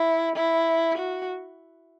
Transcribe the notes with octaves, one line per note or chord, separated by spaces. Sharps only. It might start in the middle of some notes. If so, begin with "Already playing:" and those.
Already playing: E4
E4
F#4